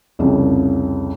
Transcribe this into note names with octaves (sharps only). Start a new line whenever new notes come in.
C2 F2 C#3